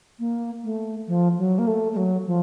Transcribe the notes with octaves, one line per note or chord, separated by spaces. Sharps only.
A#3
A3
F3
F#3
A#3
A3
A3
F#3
F3